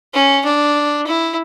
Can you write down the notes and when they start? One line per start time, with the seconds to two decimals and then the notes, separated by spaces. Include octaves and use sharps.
0.14 C#4
0.45 D4
1.07 E4